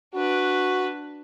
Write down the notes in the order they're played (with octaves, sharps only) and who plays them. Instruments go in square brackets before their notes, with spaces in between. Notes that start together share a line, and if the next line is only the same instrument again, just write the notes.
[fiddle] D4 B4 [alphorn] F#4